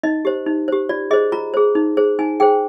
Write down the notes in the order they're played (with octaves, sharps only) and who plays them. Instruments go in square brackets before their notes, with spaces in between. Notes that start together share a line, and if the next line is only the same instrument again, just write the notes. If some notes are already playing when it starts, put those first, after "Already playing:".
[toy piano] D#4 D#5
G4 C5
D#4
G4 C5
F4 D5
G#4 D#5
C5
F4 A#5
G#4 C5
D#4
G#4 C5
D#4 G#5
G#4 C5 G5